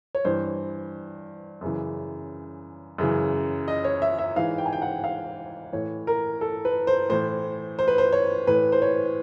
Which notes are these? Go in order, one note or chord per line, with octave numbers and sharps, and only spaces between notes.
C#5
G2 E3 C5
F#2 C#3 E3
F#2 C#3 E3
D#5
C#5
E5
E5
G#2 E3 F5
G5
G#5
G5
F#5
F5
A2 E3 C#5
A#4
A4
B4
C5
A2 E3 C5
C5
B4
C5
C#5
A2 E3 B4
C5
C#5